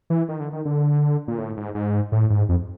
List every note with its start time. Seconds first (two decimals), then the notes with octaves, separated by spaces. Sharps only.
0.10 E3
0.29 D#3
0.40 D3
0.53 D#3
0.65 D3
1.28 A#2
1.38 A2
1.57 G#2
1.75 G#2
2.12 A2
2.30 G#2
2.49 F2